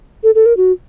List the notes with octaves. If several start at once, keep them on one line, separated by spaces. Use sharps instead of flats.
A4
A4
A#4
F#4